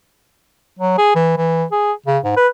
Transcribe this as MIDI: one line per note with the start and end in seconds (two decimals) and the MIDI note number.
0.79 0.96 54
0.98 1.14 68
1.15 1.36 52
1.37 1.64 52
1.72 1.93 68
2.06 2.18 49
2.24 2.33 44
2.37 2.48 71